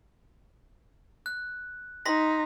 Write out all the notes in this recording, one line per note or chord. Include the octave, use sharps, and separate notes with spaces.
F#6
D#4 C6 A#6 B6